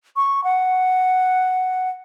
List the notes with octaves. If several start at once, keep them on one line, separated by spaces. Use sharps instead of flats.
C#6
F#5